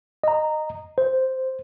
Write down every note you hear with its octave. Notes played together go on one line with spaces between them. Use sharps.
D#5 A#5
C5